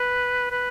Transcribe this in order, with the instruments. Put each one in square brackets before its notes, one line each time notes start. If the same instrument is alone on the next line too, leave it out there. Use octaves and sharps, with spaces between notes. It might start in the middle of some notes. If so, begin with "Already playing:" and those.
Already playing: [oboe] B4
B4